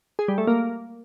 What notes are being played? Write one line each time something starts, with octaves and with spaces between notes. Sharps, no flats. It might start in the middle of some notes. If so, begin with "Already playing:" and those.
G#4
G3
A3
A#3